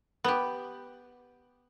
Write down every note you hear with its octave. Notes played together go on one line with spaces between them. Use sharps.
B3 G4